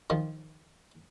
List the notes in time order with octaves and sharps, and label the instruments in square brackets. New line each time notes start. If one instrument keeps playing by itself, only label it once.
[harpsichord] D#3 F3